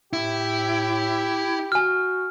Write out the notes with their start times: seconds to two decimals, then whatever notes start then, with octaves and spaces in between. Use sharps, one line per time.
0.13 A2 E4 G4
1.72 F#4 G#5 F6